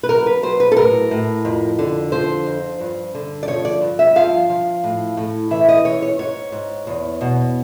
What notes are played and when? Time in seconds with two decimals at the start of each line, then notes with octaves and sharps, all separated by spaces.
0.03 B4
0.09 F#3 A#4
0.26 B4
0.43 F#3 C5
0.60 B4
0.72 A4
0.76 A2 A#4
1.11 A2
1.45 F2
1.79 D3
2.12 F3 C5
2.46 F2
2.81 G2
3.15 D3
3.43 D5
3.48 F3 C#5
3.65 D5
3.82 G2
3.99 E5
4.16 F3 F5
4.49 F3
4.84 A2
5.17 A2
5.51 E3 E5
5.69 D#5
5.85 E3 C#5
6.02 C#5
6.19 G#2 C#5
6.52 G#2
6.87 E2
7.21 B2